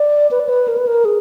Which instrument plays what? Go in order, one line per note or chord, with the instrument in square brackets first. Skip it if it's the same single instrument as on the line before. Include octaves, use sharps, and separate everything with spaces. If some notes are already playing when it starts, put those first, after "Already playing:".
Already playing: [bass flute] D5
B4
D5
B4
A#4
B4
A#4
G#4